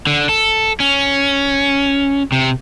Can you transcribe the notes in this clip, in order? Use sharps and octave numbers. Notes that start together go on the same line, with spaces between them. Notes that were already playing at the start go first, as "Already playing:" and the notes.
D3
A4
C#4
C3